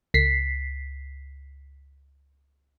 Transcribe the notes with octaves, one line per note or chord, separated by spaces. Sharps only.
C#2 B6 C7